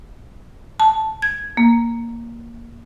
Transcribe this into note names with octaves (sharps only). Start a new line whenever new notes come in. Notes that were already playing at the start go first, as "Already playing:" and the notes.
A5
G#6
A#3